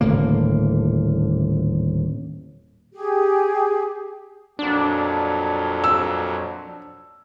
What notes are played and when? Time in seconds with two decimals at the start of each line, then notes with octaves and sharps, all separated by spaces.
0.01 D#1 A2 D3 A#3
2.93 G4 G#4
4.59 F2 A#2 F#3 D4
5.84 E6